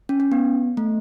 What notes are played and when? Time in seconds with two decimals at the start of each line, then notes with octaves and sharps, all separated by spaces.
0.09 C#4
0.20 C#4
0.32 B3
0.77 A3